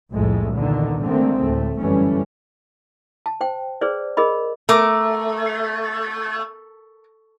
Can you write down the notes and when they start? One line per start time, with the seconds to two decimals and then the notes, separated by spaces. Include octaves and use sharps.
0.12 C2 F2 A2 G#3 A3
0.52 E2 A#2 D3 D#3
1.03 D3 D#3 G#3 A3 C4
1.44 D2 A2 A3
1.79 G1 F#2 E3 G3 A3 C#4
3.26 A5
3.41 C5 G5
3.81 G#4 B4 C5 D5
4.17 G#4 A#4 D#5 B5
4.69 A3 A#4 D6